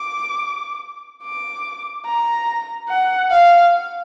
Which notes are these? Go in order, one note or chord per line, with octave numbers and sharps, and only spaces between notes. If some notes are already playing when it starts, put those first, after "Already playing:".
Already playing: D6
D6
A#5
F#5
F5